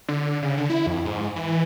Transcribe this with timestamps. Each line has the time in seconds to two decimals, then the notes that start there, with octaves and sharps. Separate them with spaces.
0.08 D3
0.42 C#3
0.57 D3
0.70 E4
0.87 F2
1.05 G#2
1.36 E3